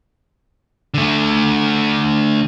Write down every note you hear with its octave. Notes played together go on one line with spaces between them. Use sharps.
D3 A3